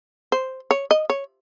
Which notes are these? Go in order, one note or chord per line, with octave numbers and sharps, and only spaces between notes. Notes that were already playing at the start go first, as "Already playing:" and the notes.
C5
C#5
D#5
C#5